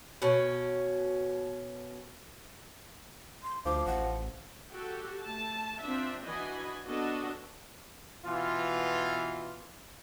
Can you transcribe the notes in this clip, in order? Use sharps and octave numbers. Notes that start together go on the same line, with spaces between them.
B2 C#4
C6
D2 F3 D6
A1 F#5
F#4 G4 A4
A3 A5
C4 D4 F4 E5
E3 D4 F#4 D#5 G#5 B5
B3 D4 F#4 A4 D#5 A5
B2 E3 F4